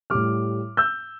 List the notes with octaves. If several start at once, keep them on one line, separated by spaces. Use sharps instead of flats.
A2 G3 D6 F6
E6 G6